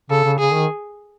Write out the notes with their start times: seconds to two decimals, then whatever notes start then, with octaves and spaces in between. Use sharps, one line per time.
0.10 C#3 A4
0.24 C#3
0.39 C#3 G#4
0.53 D#3